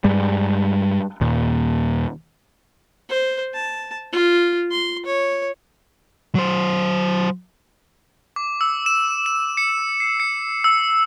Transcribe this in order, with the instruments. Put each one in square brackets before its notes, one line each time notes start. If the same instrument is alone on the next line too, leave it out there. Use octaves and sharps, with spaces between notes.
[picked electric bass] G2 G3 G#3
D#2 A#2
[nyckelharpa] C5
A5
F4
C6
C#5
[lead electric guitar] F#3 C5
[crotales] D6
E6
E7
E7
C#7
C7
C#7
E6